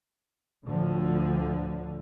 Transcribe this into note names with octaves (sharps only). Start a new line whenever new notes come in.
D2 A2 D3 F3